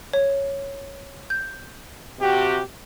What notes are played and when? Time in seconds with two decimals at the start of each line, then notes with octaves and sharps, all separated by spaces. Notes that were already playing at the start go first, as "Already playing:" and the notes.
0.13 C#5
1.30 G6
2.21 C3 F#4 G4